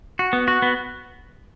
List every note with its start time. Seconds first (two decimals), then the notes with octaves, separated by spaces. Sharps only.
0.19 F#4
0.33 B3
0.48 F#4
0.62 B3